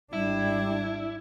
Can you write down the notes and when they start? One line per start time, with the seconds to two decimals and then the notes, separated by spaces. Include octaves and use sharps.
0.13 G#1 G3 D4 E4